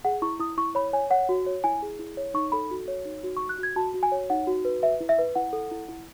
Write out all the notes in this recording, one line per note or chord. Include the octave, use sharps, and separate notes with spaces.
G#4 F#5
E4 C#6
E4 D#6
E4 C#6
C#5 B5
C#5 G#5
C#5 F#5
F#4
C#5
E4 G#5
G#4
E4
C#5
D#4 C#6
A4 B5
F#4
C#5
D#4
F#4
C#6
F#4
F#6
F#4 G#6
F#4 A5
F#4
G#5
C#5
D#4 F#5
F#4
B4
B4 E5
E4
E5
B4
E4 F#5
A4
E4
E4